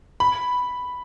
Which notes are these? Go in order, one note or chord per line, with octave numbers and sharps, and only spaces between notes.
B5